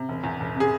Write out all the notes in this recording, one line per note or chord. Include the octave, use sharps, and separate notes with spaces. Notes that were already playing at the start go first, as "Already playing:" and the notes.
Already playing: C3
E1
E2
E1
C3 G#4